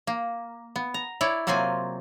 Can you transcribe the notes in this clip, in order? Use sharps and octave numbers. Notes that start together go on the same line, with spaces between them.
A#3
B3
A#5
E4 C#5 D5
C3 F#3 A#3 C4 F4 G#5